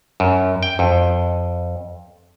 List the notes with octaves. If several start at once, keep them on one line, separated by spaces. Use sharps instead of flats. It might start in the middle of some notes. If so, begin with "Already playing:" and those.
F#2
G5
F2